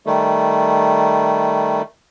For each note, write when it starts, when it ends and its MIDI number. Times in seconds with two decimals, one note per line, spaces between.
0.06 1.82 51
0.06 1.82 55
0.06 1.82 57